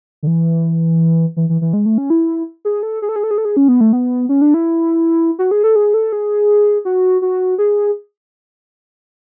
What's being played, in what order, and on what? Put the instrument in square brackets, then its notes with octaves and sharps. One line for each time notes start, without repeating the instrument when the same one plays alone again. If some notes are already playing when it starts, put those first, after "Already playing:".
[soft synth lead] D3
E3
E3
E3
E3
G#3
A3
C#4
E4
G#4
A4
G#4
A4
G#4
A4
G#4
A4
G#4
C#4
B3
A3
B3
C#4
D4
E4
F#4
G#4
A4
G#4
A4
G#4
F#4
F#4
G#4